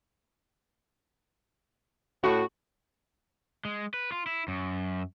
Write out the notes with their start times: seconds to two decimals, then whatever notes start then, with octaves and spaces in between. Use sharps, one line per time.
2.24 A2 F#4
3.65 G#3
3.94 B4
4.12 F4
4.26 E4
4.48 F#2